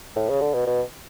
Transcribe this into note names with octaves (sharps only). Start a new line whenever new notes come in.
A2
C#3
D3
B2
B2